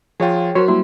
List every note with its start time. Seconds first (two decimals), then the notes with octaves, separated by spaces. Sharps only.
0.20 F3 F4 G#4 C#5 G5
0.55 F#3 F#4 A#4 C5 C#5
0.68 G3 A#3 E4 F#4